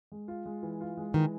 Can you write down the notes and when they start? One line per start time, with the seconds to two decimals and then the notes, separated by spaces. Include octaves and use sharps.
0.12 G#3
0.28 F4
0.46 G#3
0.63 E3
0.81 F4
0.97 G#3
1.14 D#3 E3